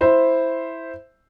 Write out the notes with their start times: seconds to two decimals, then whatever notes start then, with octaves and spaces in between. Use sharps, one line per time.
0.01 E4 C5 E5